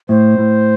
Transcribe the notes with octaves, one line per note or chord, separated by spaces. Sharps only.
A2 C5
A2